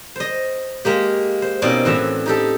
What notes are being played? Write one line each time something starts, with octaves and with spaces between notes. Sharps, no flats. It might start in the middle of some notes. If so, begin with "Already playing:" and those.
C5 D#5
G#3 A#3 G4
C5
B2 A#3 C4 C#4 D#4 D5
A2 E3 F#4 E5
D#4 G4 A4